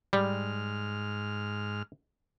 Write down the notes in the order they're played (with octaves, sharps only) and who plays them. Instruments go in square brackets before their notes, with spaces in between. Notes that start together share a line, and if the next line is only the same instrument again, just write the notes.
[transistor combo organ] G#2 F6 [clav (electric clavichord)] G3